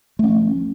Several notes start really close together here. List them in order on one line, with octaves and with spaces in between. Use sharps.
A3 C#4 F3